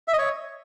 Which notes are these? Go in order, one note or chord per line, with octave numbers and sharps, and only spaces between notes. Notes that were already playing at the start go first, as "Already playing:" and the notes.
E5
D#5
C#5